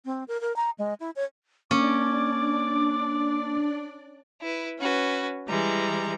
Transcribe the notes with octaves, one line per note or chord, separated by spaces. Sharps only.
C4
A#4
A#4
A#5
G#3
E4
C#5
A#3 C#4 D4 D5 D6
E4 B4
C#4 F#4 B4
E3 G3 G#3 A#5